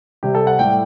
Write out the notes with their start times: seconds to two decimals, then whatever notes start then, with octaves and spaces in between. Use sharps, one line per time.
0.23 C3 G3 G4
0.35 A4
0.47 F#5
0.59 A2 G3 G5